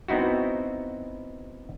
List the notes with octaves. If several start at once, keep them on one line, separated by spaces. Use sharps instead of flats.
B3 C4 D#4 E4 F#4